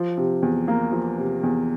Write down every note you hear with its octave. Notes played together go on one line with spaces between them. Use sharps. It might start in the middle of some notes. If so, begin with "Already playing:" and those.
Already playing: F3
C3
E2
A#3
F3
C3
E2